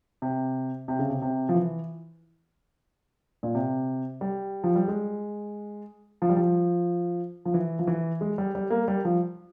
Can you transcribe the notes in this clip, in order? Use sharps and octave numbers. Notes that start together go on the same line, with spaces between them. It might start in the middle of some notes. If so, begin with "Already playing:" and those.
C3
C3
C#3
C3
C3
F3
E3
A#2
C3
G3
F3
G3
G#3
F3
G3
F3
F3
E3
F3
E3
G#3
G3
G3
A#3
G3
F3